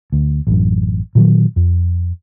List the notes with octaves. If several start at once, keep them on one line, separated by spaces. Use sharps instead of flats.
D2
A1 F#2
A#2 D#3 F#3
F2